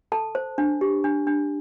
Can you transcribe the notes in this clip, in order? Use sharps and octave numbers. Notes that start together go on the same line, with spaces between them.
A4 A5
C5
D4
G4
D4
D4